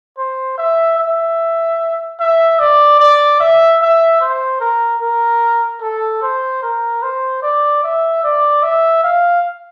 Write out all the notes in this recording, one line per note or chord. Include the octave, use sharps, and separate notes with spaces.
C5
E5
E5
E5
D5
D5
E5
E5
C5
A#4
A#4
A4
C5
A#4
C5
D5
E5
D5
E5
F5